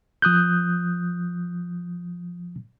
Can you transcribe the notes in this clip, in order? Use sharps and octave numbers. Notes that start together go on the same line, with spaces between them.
F3 D#6 F#6 G6